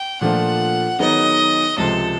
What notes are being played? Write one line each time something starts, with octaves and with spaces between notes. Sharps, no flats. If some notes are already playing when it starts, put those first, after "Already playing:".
Already playing: G5
A#2 F3 A3 D4 F4 F#5
D#3 F#3 B3 D#4 G#4 D#5
C#2 C3 F3 G#3 A4